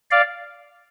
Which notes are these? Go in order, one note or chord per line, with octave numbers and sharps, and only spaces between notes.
D5 F5